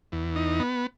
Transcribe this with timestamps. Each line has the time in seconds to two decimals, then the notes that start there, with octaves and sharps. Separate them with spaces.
0.12 E2
0.36 D#4
0.60 B3